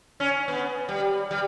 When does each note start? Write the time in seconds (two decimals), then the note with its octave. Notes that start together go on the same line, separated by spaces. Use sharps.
0.20 C#4
0.48 B3
0.89 G3
1.31 G3